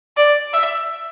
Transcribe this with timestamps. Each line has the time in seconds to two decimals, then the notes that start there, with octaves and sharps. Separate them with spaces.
0.17 D5
0.54 E5